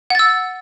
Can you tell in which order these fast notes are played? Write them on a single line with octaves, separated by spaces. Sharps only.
F#5 A6 E6